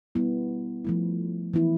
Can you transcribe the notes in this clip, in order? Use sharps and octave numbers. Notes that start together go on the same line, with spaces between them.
G3 B3 E4
F3 A3 E4
E3 B3 E4